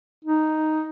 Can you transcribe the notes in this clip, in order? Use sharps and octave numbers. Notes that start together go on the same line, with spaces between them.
D#4